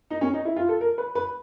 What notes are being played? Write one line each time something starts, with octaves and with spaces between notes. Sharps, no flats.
D#4
C#4
D#4
E4
F4
A4
A#4
B4
B4